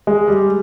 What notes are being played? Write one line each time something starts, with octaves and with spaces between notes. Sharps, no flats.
G#3
G3